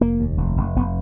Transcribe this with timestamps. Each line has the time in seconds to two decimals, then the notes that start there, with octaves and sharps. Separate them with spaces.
0.01 F1 A#3
0.19 D#2
0.38 F1
0.57 F1
0.76 F1 B3